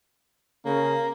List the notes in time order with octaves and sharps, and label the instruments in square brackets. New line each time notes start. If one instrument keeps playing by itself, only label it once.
[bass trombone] C#3 [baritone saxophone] A#3